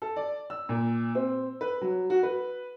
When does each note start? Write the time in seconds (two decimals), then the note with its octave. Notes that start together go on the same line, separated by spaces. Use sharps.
0.02 A4
0.16 D5
0.50 E6
0.69 A#2
1.15 C4
1.61 B4
1.81 F#3
2.10 F#4
2.23 B4